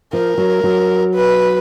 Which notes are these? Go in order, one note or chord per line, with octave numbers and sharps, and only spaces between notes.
F3 A#4
F#3
F#3
B4